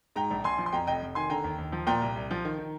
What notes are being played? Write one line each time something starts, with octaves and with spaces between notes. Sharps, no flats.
G#2 G5 A#5
A#1
A#1 G#5 C6
F3
C6
F2 G5 A#5
F1 D#5 G5
F1
D#3 G#5 C6
D3 G5 A#5
D#2
D#2
F3
A#2 G5 A#5
C2
C2
F3
D#3
D#3